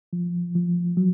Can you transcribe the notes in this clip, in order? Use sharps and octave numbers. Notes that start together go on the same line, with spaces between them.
F3
F3
F#3